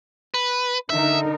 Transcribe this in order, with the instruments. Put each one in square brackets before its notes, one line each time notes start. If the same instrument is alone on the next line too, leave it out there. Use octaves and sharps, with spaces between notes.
[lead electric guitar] B4
[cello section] D3 D#4 A#4 [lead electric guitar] E5